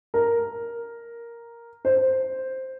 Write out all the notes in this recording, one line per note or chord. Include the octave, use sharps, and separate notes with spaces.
A#4
C5